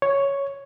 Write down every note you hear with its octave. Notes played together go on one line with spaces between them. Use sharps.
C#5